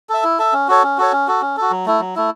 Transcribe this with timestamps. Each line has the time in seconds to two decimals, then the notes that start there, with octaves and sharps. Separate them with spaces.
0.09 A4 E5
0.24 E4
0.39 A4 E5
0.53 C#4
0.68 F#4 A4 C#5
0.83 C#4
0.98 F#4 A4 C#5
1.13 C#4
1.27 F#4 A4
1.41 C#4
1.57 F#4 A4
1.71 F#3
1.86 A3 E4
2.00 F#3
2.16 A3 E4